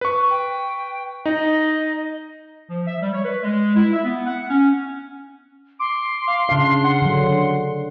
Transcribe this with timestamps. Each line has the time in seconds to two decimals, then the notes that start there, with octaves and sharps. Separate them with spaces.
0.01 B4 C#6
0.31 G5
1.26 D#4 D#5
2.69 F3
2.87 E5
3.02 G3
3.13 C#5
3.25 B4
3.43 G#3
3.76 E4
3.93 E5
4.04 B3
4.27 F#5
4.50 C#4
5.80 C6 D6
6.28 F5
6.49 C#3 D4 F5
6.84 F#5
7.02 D3 F#3